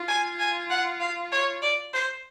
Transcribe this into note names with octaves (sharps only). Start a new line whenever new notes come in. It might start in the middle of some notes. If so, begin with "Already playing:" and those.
Already playing: F4
G#5
G#5
F#5
F5
C#5
D5
C5